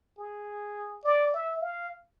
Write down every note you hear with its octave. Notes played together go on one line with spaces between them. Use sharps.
G#4
D5
E5
F5